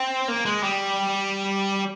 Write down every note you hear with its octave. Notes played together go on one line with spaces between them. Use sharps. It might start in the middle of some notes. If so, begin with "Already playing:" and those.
Already playing: C4
A#3
G#3
G3